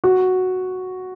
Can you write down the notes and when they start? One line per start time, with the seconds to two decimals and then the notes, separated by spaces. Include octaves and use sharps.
0.04 F#4